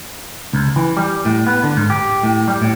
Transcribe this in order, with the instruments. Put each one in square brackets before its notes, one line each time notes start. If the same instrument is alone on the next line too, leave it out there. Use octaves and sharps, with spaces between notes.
[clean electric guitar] C#2
E3
G3
A2
B3
D3
G#2
G4
A2
G3
A2